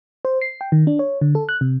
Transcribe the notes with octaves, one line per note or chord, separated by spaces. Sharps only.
C5
C7
G5
D#3
D4
C#5
D3
A4
F#6
C3